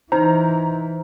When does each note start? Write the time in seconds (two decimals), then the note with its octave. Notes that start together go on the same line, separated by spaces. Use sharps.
0.12 E3 D#4 C5 A#5